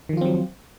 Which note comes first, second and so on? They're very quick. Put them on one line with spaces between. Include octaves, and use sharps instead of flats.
D#3 F3 F4 C4 F#3